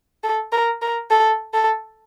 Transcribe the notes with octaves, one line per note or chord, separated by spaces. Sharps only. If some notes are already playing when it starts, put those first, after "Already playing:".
A4
A#4
A#4
A4
A4